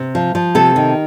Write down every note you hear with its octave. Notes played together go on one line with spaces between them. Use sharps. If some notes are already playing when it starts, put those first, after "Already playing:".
Already playing: C3
F3
F3
C3 A4
D#3